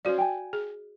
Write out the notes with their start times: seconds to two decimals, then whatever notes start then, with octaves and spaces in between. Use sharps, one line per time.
0.05 C#4 F#4 C5 D5 F5
0.18 G5 G#5
0.53 G#4